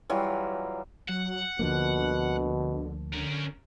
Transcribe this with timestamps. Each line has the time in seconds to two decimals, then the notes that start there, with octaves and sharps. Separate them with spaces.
0.10 E3 F#3 G3 F4
1.09 F#3 F#5
1.59 D2 B2 D3 F3 A#3
3.14 D3 C#4 A#4